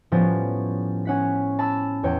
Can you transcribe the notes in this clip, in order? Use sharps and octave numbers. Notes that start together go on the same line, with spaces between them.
A2 F3 G3 B3 C#4 A6
C#4 F#5 B6
A5 B5 E6
E2 C#5 G5